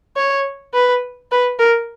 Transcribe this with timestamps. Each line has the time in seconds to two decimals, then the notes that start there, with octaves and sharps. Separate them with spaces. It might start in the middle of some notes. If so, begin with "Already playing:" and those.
0.17 C#5
0.74 B4
1.31 B4
1.59 A#4